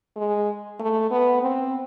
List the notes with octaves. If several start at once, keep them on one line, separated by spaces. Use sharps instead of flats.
G#3
A3
B3
C4